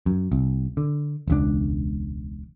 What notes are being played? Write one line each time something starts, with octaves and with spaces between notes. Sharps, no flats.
F#2
C2
D3
E1 C#2 D4